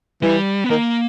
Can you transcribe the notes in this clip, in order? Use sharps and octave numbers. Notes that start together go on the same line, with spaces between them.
E3 G3
B3
D#3 A#3